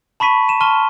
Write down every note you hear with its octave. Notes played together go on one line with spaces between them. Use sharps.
A5 B5 C#6 B6 D#7
D#7 E7
A5 C6 C#6 F6 D#7 G7